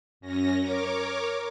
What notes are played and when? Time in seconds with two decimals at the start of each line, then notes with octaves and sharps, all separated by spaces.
0.20 F#2 C#4 A#6
0.59 A#4 C#5 D6